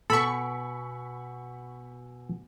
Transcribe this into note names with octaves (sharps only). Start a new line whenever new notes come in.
B2 A4 G#5 B5 C#6 E6 C#7